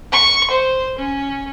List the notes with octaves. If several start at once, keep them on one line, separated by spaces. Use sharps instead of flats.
C#6
C5
C#4